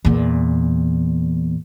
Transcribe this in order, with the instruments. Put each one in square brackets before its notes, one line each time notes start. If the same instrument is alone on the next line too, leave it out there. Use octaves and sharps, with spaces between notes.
[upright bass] E2 A#2